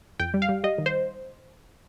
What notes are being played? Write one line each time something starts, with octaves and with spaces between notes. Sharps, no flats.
F2 G5
G3
F5
G3
G3 D#5
D#3
C5